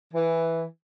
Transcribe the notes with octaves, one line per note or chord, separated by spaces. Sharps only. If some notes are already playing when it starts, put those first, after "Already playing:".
E3